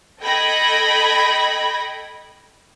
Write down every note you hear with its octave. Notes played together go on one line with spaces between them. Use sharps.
A4 D#5 G5 B5 G#6 A#6